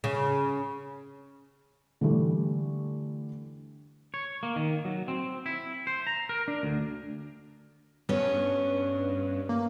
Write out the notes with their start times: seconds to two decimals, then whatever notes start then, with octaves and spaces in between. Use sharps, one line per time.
0.04 C#3
2.01 D3 E3 G3 A3
4.14 C#5
4.43 A#3
4.56 D#3
4.85 F#3
5.08 C4
5.46 E4
5.87 C5
6.07 A#5
6.29 A#4
6.48 D4
6.63 D2
8.09 G2 B3 C#4
9.49 A#3